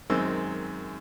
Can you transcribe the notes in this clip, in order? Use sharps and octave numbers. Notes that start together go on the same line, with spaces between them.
F#2 D#3 G#3 C4 C6 E6